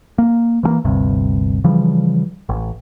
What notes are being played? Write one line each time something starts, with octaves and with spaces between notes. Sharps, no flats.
A#3
E3 F3 A#3
G1 D2 G2 C3
C#3 E3 F3 G3
A1